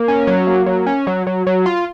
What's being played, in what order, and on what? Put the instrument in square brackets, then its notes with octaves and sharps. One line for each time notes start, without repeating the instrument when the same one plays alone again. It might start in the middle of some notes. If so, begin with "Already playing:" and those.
Already playing: [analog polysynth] A#3
C#4
F#3
A#3
F#3
C#4
F#3
F#3
F#3
F4